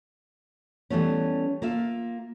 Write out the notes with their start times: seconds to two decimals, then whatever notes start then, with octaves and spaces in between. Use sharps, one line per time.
0.90 E3 G3 A3 B3 C#4
1.62 A#3 F4 E5